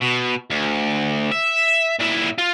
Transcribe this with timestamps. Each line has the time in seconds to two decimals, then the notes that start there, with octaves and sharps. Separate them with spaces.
0.02 B2
0.51 D2
1.32 E5
2.00 A#2 E4
2.38 F4